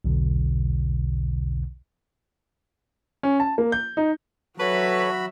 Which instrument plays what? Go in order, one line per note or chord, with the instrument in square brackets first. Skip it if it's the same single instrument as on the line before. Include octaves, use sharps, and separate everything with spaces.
[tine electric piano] B1 E2 B2 D3
[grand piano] C#4
A5
A#3
G6
D#4
[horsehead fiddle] F#3 E5 [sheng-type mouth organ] F#4 B5 [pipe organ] A4 C#5 [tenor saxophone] B4